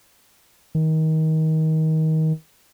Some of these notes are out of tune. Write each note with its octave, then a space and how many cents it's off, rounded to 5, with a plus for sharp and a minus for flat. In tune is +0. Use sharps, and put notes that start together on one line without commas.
D#3 +25